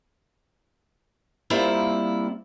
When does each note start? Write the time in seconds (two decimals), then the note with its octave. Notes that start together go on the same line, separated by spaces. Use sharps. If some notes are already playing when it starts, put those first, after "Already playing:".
1.50 G3 A#3 C4 E4 F4